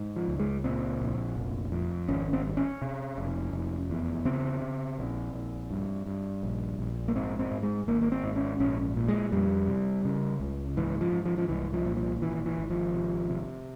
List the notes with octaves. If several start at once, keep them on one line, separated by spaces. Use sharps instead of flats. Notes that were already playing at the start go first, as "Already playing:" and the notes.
Already playing: G#2
F3
C#2
G#3
A#2 C4
A#1
F1
F2
G#1 C#4
C4
G2
C#4
C3
F1
F1
E2
C#3 C4
C#3
A#1
A#1
G2
G2
A#1
A#1
A#3
G#2 C4
C4
G#2
G#3
G#1 A#3
A#3
C4
G#2
C#4
A#1 C#4
A#2
G#3
F2 G3
C3
C#3
C#2
G#2 E3
F3
G#2
F3
F3
C2 E3
F3
A#2
F3
G#1 E3
E3
G#1
F3
C3
C3